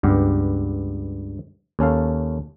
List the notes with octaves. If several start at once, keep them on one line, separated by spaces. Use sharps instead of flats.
C#2 G2 B3 G4
D#2 C#4 A4 F5